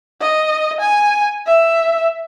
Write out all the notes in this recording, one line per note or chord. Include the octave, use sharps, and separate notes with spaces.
D#5
G#5
E5